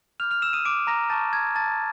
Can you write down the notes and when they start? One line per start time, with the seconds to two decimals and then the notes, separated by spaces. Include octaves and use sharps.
0.20 B5 D6 F6 G6 F7
0.31 F6 F7
0.42 E6 E7
0.53 D#6 D#7
0.65 D6 D7
0.87 A#5 A#6
1.10 A5 C#6 E6 G6 A6
1.33 G#6
1.56 A5 A6